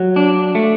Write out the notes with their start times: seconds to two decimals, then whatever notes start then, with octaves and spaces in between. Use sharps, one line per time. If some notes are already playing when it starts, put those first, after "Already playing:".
Already playing: F#3
0.16 D4
0.55 A3